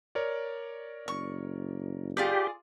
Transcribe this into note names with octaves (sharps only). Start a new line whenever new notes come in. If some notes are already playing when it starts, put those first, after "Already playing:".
A#4 C#5 D5
F#1 C#6
F4 G4 G#4 D5